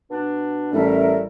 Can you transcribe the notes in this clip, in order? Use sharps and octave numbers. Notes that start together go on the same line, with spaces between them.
B2 D4
A1 A2 G3 A4 A#4 E5